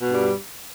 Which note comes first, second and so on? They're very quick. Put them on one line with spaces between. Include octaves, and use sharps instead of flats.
B2 G2 G3